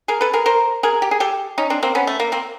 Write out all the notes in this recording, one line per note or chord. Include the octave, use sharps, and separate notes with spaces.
G#4 A#4
A4 B4
G#4 A#4
A#4 C5
G#4 A#4
G4
G#4
G4 A4
C#4 D#4
C4 D4
A#3 C4
B3 C#4
A3
A#3
A#3 C4